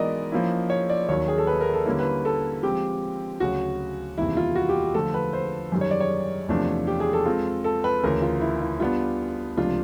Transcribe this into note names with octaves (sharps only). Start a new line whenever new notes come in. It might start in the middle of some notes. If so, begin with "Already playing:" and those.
Already playing: E3 G#3 B3 D#4 F#4 A#4 D5 D#5
F3 A#3 C#4 E4
C#5
D5
D#2 D#3 F#3 C#5
G#4
A4
B4
A#4
A4
D3 G3 A#3 C#4 E4
B4
A4
F3 G#3 C4 G4
D2 C#3 F#3 F#4
E2 C3 D#3 G3 A#3 E4
F4
F#4
G4
D3 F3 A3 A4
B4
C5
F#2 D#3 G3
C#5
D5
C#5
E2 C3 F3 A3 D4
G4
G#4
A4
G#3 C4 F4
A4
B4
D2 C#3 E3 A#4
F4
E4
E4
G3 B3 D4 F4
C#2 C3 F3 A3 D4 F4